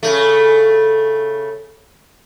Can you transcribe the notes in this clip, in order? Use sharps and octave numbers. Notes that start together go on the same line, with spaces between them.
C#3 A3